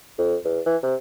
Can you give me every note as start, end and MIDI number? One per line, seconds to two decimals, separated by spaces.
0.18 0.35 41
0.44 0.60 40
0.66 0.76 52
0.83 0.95 48